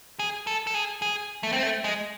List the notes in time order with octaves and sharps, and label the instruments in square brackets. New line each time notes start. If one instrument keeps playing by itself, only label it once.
[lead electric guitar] G#4
A4
A4
G#4
G#4
A3
C4
A3
G#3